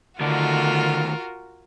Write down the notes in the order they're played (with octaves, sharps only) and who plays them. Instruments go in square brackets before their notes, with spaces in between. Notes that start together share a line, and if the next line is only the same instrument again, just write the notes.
[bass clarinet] D3 [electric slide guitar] D#3 A3 D5 [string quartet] F4 F#4 A#4